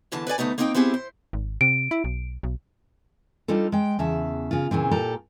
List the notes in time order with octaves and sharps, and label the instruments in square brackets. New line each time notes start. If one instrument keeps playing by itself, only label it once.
[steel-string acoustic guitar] E2 D3 E3 A5
B4 C#5 D5 G#5
D2 A3 B3 D#4 A#5
A#3 C4 D#4 A#4 F5 G5
B3 C4 E4 G4 G#4
C5
[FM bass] G#1
[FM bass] C3 [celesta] D7
[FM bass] E4
B1
B1
[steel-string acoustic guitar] G3 D4 D#4 F4 A4
G#3 G5
E2 C#3 E5 A5
C#3 F4
A#2 C#3 E3 C4
A#2 G4 A4 A#5